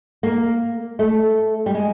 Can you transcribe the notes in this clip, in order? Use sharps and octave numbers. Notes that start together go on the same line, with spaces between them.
A#3
A3
G3
G#3